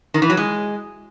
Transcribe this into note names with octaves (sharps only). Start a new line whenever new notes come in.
D#3
E3
F#3
G#3